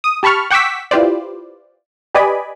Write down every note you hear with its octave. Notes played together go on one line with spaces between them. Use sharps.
D#6
G4 A5 B5 C#6 F6
F#5 G5 C#6 D6 E6 B6
E4 F4 G4 B4 C5 D5
G4 B4 D5 D#5 G#5 B5